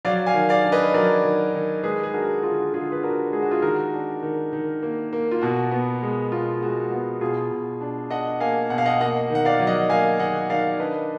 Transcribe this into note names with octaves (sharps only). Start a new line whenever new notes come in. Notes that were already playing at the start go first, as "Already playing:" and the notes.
F#3 D5 F5
F5 G#5
D#3
D5 F5
D4
B4 D#5
F#3 A#4 D5
D#3
D#3
G#3 G#4 B4
G#4
D4 F#4 A#4
D3 F4 G#4
D3 F4 G#4
B4
D4 F#4 A#4
G#3 G#4
F#4
F4 G#4
D#3 F#4 A#4
D4
D#3
D#3
A#3
A#3
F4
B2 F#4
B3
G#3
B2 F4
G#3 F#4
B3 F#4
B2 F4 G#4
B2
D4
D4 D#5 F#5
A#3 F5 G#5
B2 F#5
F5
D#5 F#5
A#3 D#5 F#5
D#3 F#5
D5 F5
F#3
D#5 F#5
A#3 F5 G#5
D#3 D#5 F#5
D#3 D5 F5
D4 B4 D#5